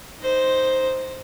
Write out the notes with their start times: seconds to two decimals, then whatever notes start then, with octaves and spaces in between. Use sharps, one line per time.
0.20 D#4 C5